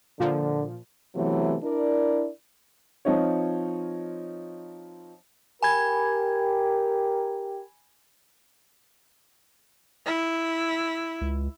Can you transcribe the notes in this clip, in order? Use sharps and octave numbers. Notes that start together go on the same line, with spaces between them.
A#2 D3 F3
C3 E3 F#3 A3 B3
D4 E4 A#4 D5
F3 C4 D#4 F4 C#5
G4 A#4 G#5 B5 G#6
E4
C#2